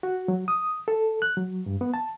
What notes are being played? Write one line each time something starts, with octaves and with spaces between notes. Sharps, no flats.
F#4
F#3
D#6
A4
F#6
F#3
G2
B3
A5